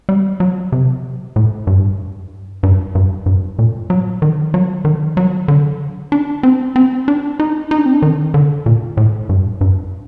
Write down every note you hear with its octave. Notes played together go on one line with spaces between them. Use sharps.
G3
F#3
C3
A2
G2
G2
G2
G2
A#2
F#3
D#3
F#3
D#3
F#3
D3
D4
C4
C4
D4
D#4
D#4
D4
C4
D4
D#3
D3
A#2
A2
G2
G2